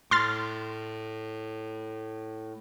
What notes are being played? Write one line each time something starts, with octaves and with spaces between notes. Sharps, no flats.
A2 C6 F6 A6